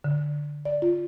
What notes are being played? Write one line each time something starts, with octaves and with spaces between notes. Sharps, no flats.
D3
D5
F4